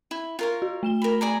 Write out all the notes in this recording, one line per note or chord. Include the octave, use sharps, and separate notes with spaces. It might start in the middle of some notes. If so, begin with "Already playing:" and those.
E4
F4 A#4 C#5
F#4
A3 E7 G7
A#4 B5
G#4 D5 A#5